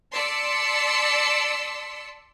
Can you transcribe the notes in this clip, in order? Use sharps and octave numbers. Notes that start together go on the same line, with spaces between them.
D5 A5 C6 E6 B6 C#7